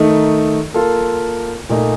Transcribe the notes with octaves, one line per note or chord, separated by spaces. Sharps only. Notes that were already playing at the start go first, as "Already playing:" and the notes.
Already playing: D#3 A3 D#4
A#3 F4 A4
A#2 A3 D#4